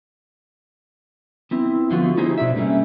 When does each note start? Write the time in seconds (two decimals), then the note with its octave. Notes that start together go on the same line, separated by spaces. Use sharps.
1.51 B3 C4 E4
1.91 D3 F3 A3 B3 F4 F#4
2.17 A3 D#4 E4 G4 G#4 C5
2.38 B2 D4 D5 E5
2.56 G3 A3 A#3 C#4